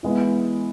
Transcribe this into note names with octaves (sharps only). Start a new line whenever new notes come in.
E3 G#3 B3 E4